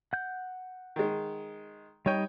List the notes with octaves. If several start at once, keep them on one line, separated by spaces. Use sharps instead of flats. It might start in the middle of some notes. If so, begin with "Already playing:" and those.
F#5 G6
D#3 G#3
G3 D#4 C#5 D#5 G5